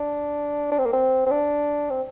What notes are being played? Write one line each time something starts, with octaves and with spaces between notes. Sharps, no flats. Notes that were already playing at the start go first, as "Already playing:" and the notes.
Already playing: D4
D4
C4
A#3
C4
C4
D4
C4